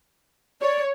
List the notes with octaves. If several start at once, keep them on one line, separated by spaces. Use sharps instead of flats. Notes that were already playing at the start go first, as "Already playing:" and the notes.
C#5 D5